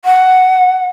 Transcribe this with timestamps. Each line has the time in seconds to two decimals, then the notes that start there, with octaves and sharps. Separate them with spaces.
0.04 F#5